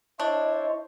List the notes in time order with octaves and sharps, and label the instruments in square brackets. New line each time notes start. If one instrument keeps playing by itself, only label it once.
[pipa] D4 [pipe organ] E4 C5 C#5 [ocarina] D#5